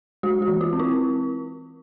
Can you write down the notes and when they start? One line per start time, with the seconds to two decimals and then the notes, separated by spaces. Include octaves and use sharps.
0.23 G#3 F#4
0.42 F#4
0.48 E3
0.61 F4
0.73 C4
0.80 E4